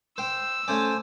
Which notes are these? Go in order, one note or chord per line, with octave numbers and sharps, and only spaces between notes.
C5 G5 E6
A3 C#4 C5 D5 G#5